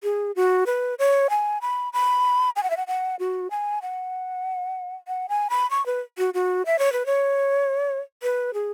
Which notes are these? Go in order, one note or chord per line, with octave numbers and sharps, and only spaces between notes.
G#4
F#4
B4
C#5
G#5
B5
B5
G#5
F#5
E5
F#5
F#5
F#4
G#5
F#5
F#5
G#5
B5
C#6
B4
F#4
F#4
E5
C#5
B4
C#5
B4
G#4